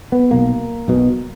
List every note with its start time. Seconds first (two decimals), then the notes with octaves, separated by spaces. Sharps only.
0.12 B3
0.31 B1 B2 A#3
0.88 B1 B2